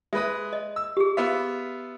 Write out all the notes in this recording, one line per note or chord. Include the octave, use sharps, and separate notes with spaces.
G#3 B4 E5 D#6
D#5
E6
G4 G#4
B3 F4 E5